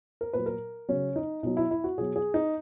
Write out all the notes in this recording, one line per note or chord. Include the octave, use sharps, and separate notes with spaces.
A#4
A#2 F#3 B4
A#4
C#3 F#3 C#4
D#4
B2 F#3 D#4
E4
E4
F#4
B2 F#3 G#4
G#4
D#4